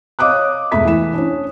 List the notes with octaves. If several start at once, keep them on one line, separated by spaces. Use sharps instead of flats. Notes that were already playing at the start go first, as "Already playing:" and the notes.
C#5 D#5 F5 D6 D#6 F#6
E1 A3 E5 B5 B6
E3 E7
C#4 D4